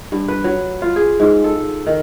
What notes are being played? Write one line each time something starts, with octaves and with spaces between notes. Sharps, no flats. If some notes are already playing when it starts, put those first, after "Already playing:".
G2
B4
F#3
F4
G#4
G#2
A4
D#3